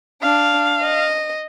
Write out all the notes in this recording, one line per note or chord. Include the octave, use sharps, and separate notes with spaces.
D4 F5
D#5